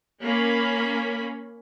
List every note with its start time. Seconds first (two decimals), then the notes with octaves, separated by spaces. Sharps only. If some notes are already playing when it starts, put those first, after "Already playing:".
0.21 A#3 C#4 B5